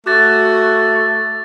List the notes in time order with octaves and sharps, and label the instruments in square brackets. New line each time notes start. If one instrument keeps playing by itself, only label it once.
[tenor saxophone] A3 [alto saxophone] F#4 [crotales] D6 A6